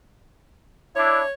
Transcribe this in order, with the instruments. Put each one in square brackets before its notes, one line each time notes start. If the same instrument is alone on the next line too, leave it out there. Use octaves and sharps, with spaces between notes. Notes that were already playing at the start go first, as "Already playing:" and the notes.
[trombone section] D4 E4 [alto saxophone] C#5